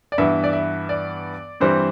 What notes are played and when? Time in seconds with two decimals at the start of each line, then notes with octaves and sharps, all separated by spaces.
0.12 D5
0.18 G2 E3 B3 E5
0.44 D5
0.53 E5
0.89 D5
1.60 G2 E3 G3 C4 C5